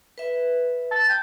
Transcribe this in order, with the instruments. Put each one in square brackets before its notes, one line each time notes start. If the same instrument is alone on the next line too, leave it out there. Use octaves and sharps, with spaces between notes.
[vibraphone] B4 E5
[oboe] A5
G5